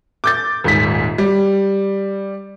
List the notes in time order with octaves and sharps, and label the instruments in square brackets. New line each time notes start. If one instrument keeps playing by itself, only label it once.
[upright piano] D6 G6 A6
D#1 G#2 B6
G3